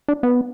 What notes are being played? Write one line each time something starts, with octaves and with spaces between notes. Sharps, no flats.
D4
B3